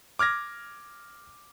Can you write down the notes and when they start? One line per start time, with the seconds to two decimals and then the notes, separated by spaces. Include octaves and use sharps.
0.19 D6 F6 G#6 A#6